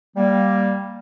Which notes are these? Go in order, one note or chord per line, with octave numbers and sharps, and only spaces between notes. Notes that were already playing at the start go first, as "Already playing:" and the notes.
G3 A#3